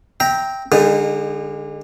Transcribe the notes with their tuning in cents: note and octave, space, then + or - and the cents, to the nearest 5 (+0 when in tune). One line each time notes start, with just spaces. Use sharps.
E5 -25 G5 +0 A#5 +0
D3 +5 G#3 -35 D#4 -15